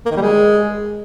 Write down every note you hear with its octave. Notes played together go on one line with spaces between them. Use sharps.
A#3
D#3
G3
G#3